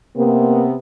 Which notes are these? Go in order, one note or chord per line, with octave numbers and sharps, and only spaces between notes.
C3 A#3 B3